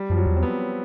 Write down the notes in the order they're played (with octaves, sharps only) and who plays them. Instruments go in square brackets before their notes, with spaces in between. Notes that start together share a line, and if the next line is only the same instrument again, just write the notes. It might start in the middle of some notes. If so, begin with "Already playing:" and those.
Already playing: [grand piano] G3
[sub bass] F#2 [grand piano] F3
[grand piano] F#3
[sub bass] E2
[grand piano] C4
B3